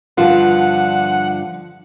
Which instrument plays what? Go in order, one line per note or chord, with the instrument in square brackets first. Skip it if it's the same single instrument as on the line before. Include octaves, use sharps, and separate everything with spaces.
[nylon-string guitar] G2 D3 F3 [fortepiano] F4 [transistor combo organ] F#5